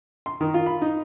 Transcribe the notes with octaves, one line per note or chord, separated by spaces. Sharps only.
C6
D#3
F4
B5
D#4